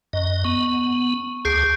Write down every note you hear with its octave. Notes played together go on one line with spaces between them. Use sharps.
F#2 D#5
B3 C#6
D2 G#4 G6 C7 D7